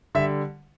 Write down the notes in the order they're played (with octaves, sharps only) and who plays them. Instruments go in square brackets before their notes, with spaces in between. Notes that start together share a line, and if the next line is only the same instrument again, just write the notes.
[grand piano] D3 G3 E5